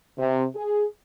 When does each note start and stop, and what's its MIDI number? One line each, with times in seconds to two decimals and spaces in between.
0.19 0.45 48
0.55 0.85 68